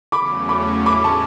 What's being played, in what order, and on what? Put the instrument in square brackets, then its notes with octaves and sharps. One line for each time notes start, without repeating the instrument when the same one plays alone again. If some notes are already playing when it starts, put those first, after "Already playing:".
[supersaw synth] E2 C#3 F#3 A3 C#4 [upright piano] B5 D6
[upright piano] B5 D6
[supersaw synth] A2 G#3 C#4 E4 [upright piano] B5 D6
[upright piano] A5 C#6